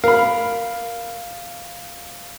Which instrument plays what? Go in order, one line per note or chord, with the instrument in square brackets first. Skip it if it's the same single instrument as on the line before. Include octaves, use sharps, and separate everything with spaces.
[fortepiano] A#4 B5 [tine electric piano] F5